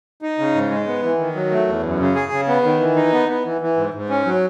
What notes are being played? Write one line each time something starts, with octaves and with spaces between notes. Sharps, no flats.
D#4
C#3
G#2
G#3
B3
E3
D#3
F#3
A3
E2
F#2
C#3
G#4
C#3
B3
D#3
E3
D#4
B3
B3
E3
E3
G#2
G#2
C#4
F#3